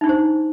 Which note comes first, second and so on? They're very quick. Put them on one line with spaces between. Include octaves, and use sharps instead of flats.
D#4 D4 G4 C5